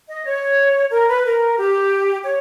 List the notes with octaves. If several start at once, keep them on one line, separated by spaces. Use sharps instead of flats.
D#5
C#5
A#4
B4
A#4
G4
C#5